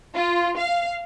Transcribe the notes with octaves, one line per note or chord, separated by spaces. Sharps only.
F4
F5